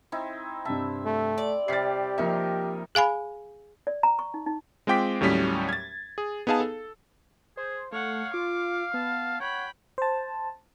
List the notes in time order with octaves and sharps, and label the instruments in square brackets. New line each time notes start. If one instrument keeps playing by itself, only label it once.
[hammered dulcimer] C4 D#4 E4
[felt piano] G2 C3 A5 [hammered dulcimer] E5
[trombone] A3
[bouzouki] D5
[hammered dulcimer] C3 G3 [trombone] G4 [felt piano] A6 B6 C7
[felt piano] F3 A#3 E5 [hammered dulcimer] D#4 A#4
[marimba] G#4 F5 G#5 B5
[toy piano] D5
A#5
C#6
D#4
D#4
[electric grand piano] G#3 C4 F4 G5 D6 B6
D#2 A2 F#3 G3 C#4 B6
G#6 A6
G#4
B3 D#4 G#4 F5 A5
A4
[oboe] G#4 [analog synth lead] C5
[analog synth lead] A3 [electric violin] C#5 F#5 [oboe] F5
[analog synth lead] F4 [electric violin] D6
[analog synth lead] B3 [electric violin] A5
[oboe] C#5 [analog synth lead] F#5 [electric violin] G5 B5
[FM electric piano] C5 A5